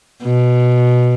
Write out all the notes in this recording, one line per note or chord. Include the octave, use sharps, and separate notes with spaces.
B2